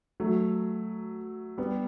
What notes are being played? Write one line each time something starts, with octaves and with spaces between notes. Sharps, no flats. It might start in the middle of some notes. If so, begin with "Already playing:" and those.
F#3 A3
G3 B3